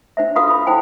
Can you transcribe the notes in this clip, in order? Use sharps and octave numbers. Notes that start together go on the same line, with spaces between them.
D4 C5 E5
F4 F#4 A4 B4 F5 D#6
B5
E4 A4 C5 G5 G#5